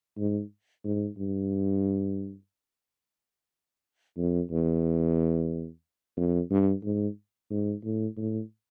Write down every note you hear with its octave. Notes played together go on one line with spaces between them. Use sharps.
G#2
G#2
G2
F2
E2
F2
G2
G#2
G#2
A2
A2